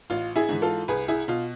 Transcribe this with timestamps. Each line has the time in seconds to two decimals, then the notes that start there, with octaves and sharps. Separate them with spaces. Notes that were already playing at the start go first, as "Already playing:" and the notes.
0.10 A1 F4
0.36 E4 G#4
0.49 G#2 E3
0.62 F4 A4
0.88 C2 G#4 B4
1.08 E4 G#4
1.28 B2 F4